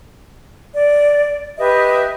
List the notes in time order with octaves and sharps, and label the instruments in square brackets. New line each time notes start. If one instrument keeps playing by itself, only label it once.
[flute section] D5
G4 B4 D#5 E5